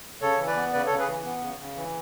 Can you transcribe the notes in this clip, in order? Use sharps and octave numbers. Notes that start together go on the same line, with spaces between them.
C#3 A4 C#5
E3
B4 D5
B3
C#3 B4 D5
C#3 A4 C#5
G#4 B4
E3
B3
C#3
C#3
E3